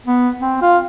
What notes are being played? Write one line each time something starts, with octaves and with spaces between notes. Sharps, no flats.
B3
C4
F4